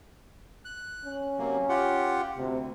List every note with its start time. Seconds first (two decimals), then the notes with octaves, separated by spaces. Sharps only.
0.65 F#6
1.05 C#4
1.38 C3 F#3 A#3
1.69 F4 G4 F#5
2.37 D2 C3